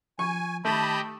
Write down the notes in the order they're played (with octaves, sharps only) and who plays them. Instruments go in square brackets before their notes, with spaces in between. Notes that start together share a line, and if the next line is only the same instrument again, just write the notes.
[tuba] F3 [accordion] G#5 [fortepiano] C#6
[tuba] D#3 [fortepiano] A3 [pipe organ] G4 D#5 G5 [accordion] A5 B5